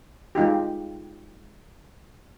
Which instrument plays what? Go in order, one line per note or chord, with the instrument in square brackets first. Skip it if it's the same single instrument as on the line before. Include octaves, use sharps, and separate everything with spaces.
[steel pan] G#3 D#4 F4 G4